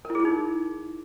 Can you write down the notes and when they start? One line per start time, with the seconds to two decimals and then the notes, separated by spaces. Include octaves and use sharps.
0.05 A#4
0.10 E4
0.15 G#4
0.20 E4
0.25 D#4